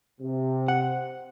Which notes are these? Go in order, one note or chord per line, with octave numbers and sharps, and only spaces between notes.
C3
F#5